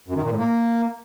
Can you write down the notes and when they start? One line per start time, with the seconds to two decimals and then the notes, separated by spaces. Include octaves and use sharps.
0.08 F#2
0.16 D#3
0.23 A#2
0.31 A2
0.38 A#3